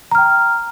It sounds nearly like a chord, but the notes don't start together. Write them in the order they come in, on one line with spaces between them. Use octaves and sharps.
A#5 F6 G5